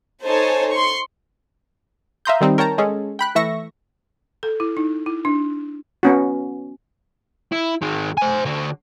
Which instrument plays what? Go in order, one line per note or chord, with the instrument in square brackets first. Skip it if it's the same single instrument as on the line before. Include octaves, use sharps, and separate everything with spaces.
[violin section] D#4 A4 C5 C#5 G#5 A5
C6 C#6
[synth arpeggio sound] E5 F5 A#5 C6 D#6 G6
D#3 G3 C4 D#4
A#4 C#5 G5 A5 A#5
G#3 C#4 G#4 A4
G5 B5 F#6
E3 A3 E5 C#6 A#6
[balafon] A4
E4
D#4
E4
D4
[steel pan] B3 C#4 F#4
[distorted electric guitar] E4
D#3 G#3
C5 G#5
D3 F#4